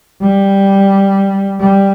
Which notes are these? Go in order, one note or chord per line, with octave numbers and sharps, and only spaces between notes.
G3
G3